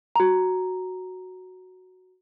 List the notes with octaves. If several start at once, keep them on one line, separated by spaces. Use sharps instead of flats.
F#4 A#5